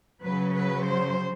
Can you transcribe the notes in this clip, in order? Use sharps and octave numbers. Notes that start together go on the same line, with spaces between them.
C#3 F#3 B4
B4
C5